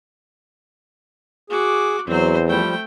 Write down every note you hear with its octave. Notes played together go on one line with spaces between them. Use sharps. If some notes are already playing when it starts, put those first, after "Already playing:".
F#4 G#4 D6
E2 F#3 C4 C5
F3 G3 A3 G5